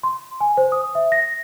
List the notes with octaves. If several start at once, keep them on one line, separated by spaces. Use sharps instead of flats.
C6
G#5
C5
D#6
E5
A#6